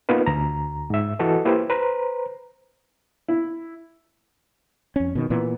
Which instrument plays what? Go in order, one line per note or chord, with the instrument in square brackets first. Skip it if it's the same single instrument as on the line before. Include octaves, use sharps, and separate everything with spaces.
[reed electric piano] A#3 B3 D#4 F4 B4
D2 A#5
G#2 E5
E3 F#4 A4 D#5
A#3 E4 G4 B4 C5
B4 C5 A#5
[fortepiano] E4
[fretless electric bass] F2 C#4
B2 D#3
A#2 E3 B3